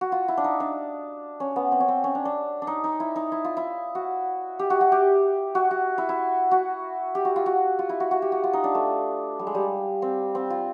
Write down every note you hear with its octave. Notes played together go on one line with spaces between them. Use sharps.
F#4
F4
E4
D4
D#4
D4
C#4
B3
C4
C#4
C4
C#4
D4
D4
D4
D#4
D#4
E4
D#4
E4
F4
E4
F#4
G4
F#4
F#4
G4
F#4
F#4
E4
E4
F#4
G4
F#4
F4
F#4
F4
E4
F#4
F#4
G4
F#4
F4
D#4
D4
A3
G3
G#3
G3
C4
C4
F4